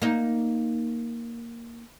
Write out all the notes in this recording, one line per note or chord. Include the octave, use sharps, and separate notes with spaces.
A#3 D#4